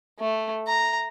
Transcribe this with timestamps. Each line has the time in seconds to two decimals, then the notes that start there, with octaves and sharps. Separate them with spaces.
0.19 A3
0.67 A#5